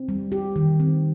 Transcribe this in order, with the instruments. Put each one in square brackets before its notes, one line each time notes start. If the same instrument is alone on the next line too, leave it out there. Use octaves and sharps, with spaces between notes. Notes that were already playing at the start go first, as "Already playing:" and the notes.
Already playing: [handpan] C4
G3
G4
D#3
C4